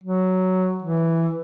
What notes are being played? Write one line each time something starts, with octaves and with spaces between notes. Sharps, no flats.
F#3
E3